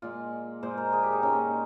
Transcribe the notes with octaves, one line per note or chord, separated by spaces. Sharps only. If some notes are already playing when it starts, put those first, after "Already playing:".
A#2 G#3 F4
A#2 G#3 C5
A#4
G#4
G4
D#4
A#2 G#3 C#4